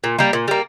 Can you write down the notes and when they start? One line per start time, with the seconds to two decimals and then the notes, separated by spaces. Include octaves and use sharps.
0.04 A#2
0.19 G3 A#3
0.33 A#2
0.48 G3 A#3